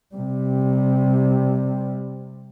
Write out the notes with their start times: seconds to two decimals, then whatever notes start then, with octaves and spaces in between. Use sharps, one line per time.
0.15 C3 G3